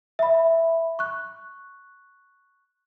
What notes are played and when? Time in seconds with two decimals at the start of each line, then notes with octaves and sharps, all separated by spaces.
0.19 E5 B5
0.99 C#6 F#6